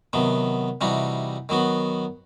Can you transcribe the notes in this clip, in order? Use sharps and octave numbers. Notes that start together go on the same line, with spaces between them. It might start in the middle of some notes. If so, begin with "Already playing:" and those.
C3 D#3 F#3 B3
C3 E3 G3 D#4 F#4
D#3 F#3 B3 F#4